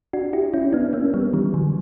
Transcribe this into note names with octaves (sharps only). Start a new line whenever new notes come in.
D4 F#4
E4 G4
C#4 E4
B3 D4
A#3 C#4
G3 B3
E3 G3
D3 F#3